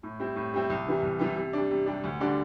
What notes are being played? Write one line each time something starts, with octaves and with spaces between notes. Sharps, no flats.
A2
G3 C4 E4
A2
G3 C4 E4
C2
C3 E3 G3
C2
C3 E3 G3
C3
G3 D4
C3
G3 D4
D2
D3 G3 D4